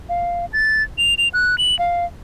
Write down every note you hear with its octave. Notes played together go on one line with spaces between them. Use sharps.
F5
A6
F7
F7
F#6
F#7
F5